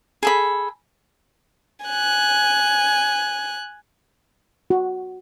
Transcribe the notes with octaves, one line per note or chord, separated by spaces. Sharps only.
G#4 A4 B5
G#5 F#6
F#4